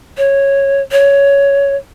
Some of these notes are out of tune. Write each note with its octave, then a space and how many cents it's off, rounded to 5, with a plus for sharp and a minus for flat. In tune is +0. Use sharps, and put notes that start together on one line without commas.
C#5 -10
C#5 +10